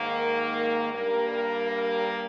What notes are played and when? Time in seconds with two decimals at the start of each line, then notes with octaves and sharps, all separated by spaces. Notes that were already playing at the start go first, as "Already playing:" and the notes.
Already playing: G#2 D#3 A#3
0.16 A#4
0.55 A#4
0.92 G2 G3 A#3 A#4
1.30 A#4
1.69 A#4